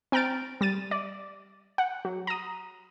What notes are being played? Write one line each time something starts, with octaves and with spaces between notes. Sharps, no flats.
C4 G5 A#5 F6 A6 D7
G3 A6 D#7
D5
F#5
F#3
A#5 D#6